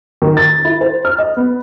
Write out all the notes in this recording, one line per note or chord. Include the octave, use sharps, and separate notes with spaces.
D#3
A6
E4
C5
F6
D#5
B3